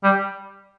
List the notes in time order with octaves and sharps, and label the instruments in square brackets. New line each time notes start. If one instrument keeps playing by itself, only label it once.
[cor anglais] G3